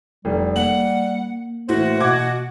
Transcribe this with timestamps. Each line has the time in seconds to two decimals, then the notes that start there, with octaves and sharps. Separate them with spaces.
0.25 F1 G3
0.56 A#3 F#5 F#7
1.69 A2 E3 F#4 C5
2.00 B2 F#5 D6 G#6